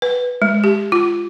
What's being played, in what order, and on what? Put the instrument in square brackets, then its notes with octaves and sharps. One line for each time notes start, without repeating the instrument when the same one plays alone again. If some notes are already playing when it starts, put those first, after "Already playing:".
[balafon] B4
G#3
G4
F4